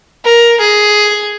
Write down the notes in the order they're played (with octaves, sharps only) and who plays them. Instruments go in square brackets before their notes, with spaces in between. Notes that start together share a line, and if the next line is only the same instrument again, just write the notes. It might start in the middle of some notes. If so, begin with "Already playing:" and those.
[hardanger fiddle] A#4
G#4